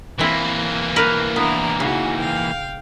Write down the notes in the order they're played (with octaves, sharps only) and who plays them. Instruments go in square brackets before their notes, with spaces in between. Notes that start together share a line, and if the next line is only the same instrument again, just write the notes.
[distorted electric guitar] E3 A#3 [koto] C4 E4
[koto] A#4 B4
[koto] B3 [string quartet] D4 E4 A#5
[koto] C#3 [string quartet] D#4 F#4 G#5
[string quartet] F5 G5